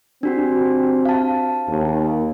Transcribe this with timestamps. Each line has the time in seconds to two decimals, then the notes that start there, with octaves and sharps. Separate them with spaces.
0.23 C4 D4 F#4 G4
1.05 F5 A5
1.69 D#2